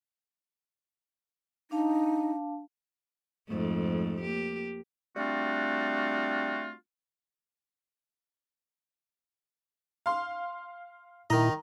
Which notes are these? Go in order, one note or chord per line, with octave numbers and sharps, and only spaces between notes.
D4 D#4 F5 A5
F2 G#2 A3
A#3 G4
G3 A3 C4 D4 F4 F#4
F5 C6
A#2 D#3 E4 D#5 A#5